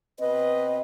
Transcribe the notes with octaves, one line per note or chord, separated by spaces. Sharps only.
B2 C4 B4 D#5